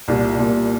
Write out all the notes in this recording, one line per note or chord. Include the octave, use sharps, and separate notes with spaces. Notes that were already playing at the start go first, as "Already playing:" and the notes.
C2 A#2 G3
C2 A#2 G3